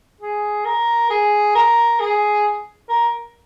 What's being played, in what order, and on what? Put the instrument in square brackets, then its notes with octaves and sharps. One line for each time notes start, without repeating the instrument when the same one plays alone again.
[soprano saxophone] G#4
A#4
G#4
A#4
G#4
A#4